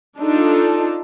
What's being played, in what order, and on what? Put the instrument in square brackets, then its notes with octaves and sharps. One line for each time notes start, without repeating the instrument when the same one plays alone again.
[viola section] D4 D#4 F4 A4